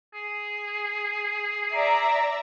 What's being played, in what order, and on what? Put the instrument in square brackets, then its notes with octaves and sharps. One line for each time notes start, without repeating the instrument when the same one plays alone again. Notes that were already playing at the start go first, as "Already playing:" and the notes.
[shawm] G#4
[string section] D5 E5 A#5